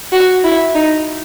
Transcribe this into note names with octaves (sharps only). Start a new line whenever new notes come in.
F#4
E4
D#4